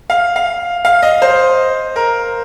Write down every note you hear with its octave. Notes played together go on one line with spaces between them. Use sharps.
F5
F5
F5
D#5
C5
A#4